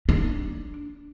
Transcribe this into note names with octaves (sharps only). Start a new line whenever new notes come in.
D4